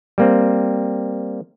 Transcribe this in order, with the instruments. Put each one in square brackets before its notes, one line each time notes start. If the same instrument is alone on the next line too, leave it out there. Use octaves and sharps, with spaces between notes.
[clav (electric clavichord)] G3 A#3 C4